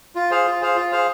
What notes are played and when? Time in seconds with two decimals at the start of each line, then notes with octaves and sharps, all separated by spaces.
0.15 F4
0.31 G#4 C5 F5
0.47 F4
0.62 G#4 C5 F5
0.76 F4
0.92 G#4 C5 F5